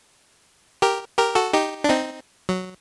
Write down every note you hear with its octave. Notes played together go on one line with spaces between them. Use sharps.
G4 A#4
G4 A#4
F#4 A4
D#4 G4
D4
C4 D#4
F#3